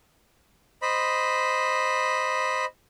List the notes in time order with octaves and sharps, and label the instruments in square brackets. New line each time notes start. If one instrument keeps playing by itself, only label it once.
[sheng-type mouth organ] C5 D#5 B5